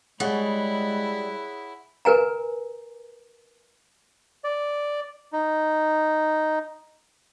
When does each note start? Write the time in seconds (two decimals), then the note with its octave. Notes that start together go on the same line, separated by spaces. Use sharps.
0.20 G3 G#3 E4 G#4 C#5 F#5
2.05 A#4 B4 G#5 A#5
4.44 D5
5.33 D#4